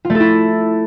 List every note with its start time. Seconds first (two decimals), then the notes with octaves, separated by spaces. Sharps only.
0.05 F4
0.10 A3
0.15 A4
0.20 E4